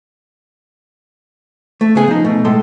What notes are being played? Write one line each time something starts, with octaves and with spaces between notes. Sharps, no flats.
A3
C#3 B3 G#4
F3 D#4
B2 A3
A2 G#3 A4 C6